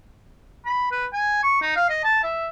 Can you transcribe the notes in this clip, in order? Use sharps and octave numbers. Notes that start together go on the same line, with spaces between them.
B5
B4
G#5
C#6
D#4
F5
D#5
A5
E5